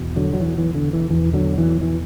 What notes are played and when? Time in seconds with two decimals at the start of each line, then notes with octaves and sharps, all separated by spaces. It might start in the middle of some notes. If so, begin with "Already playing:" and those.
Already playing: E2 B2
0.16 D3 F#3
0.33 F#3
0.40 E3
0.58 E3
0.75 D3
0.93 E3
1.10 E2 B2 E3
1.33 D3 F#3
1.58 E3
1.81 E3